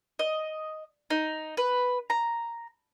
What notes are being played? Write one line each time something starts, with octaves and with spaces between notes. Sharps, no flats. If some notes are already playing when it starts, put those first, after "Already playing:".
D#5
D#4
B4
A#5